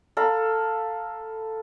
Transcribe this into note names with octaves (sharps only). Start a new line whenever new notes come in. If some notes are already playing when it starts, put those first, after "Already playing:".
A4 F5 A#5 B5